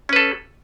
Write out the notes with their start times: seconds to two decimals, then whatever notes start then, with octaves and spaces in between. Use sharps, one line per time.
0.09 C#4
0.13 B4
0.16 A4